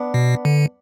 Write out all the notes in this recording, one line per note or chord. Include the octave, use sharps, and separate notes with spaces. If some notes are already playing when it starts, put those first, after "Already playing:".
Already playing: B3 D4
B2
D3